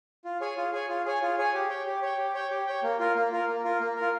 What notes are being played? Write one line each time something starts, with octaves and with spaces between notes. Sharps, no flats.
F4
G#4 C#5 G#5
F4
G#4 C#5 G#5
F4
G#4 C#5 G#5
F4
G#4 C#5 G#5
G4
C#5 G5
G4
C#5 G5
G4
C#5 G5
G4
C#5 G5
A#3
F4 A#4
A#3
F4 A#4
A#3
F4 A#4
A#3
F4 A#4